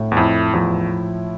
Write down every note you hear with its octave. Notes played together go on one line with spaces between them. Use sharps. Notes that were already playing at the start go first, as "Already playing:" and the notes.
Already playing: A2
E2
F2 E4
E2 F3